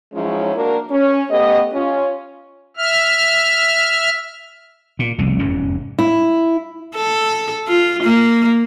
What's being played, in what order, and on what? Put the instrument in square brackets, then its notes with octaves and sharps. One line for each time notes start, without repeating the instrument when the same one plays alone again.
[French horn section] F3 F#3 G#3 C#4 D#4 E4
A#3 D4 F#4 A#4
C#4
A3 B3 G4 D#5
C#4 F4
[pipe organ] E5 F6
[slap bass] A#2
F1 C2 C#3
F1 E2 G#2 C#4
[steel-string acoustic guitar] E4
[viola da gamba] A4
F4
A#3